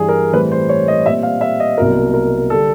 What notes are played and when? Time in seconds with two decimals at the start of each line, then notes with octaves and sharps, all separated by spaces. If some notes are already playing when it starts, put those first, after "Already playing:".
Already playing: G2 E3 G3 G#4
0.09 A#4
0.33 A2 E3 G3 C4 B4
0.52 C5
0.69 C#5
0.88 D#5
1.06 A#2 G3 C4 E5
1.23 F5
1.41 E5
1.60 D#5
1.78 C2 B2 F#3 A#3 A#4
2.14 A#4
2.50 D3 G3 A4